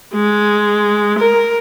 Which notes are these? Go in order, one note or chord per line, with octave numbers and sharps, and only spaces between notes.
G#3
A#4